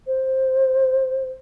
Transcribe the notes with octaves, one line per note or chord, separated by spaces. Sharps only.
C5